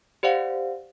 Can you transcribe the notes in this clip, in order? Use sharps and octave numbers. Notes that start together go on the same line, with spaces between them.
G4 C5 D5 F5 F#5